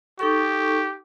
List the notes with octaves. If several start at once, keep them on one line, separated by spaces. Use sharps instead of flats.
D#4 G4 A4 C#6